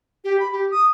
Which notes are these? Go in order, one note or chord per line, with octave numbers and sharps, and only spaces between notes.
G4
B5
G4
D#6